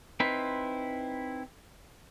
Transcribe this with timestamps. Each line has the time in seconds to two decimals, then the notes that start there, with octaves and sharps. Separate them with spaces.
0.20 C4 D#4 E4 B4 C5